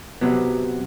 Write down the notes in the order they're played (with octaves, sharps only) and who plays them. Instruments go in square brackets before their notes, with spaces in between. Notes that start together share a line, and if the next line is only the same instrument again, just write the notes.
[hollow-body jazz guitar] C3 F#3 B3